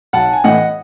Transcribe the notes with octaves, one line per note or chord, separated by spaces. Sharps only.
B1 F#5 A5
G#5
A2 E3 A3 D#5 F#5